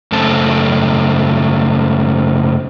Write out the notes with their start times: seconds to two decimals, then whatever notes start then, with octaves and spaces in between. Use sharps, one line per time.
0.12 F#2 C#3 A3 C4 A5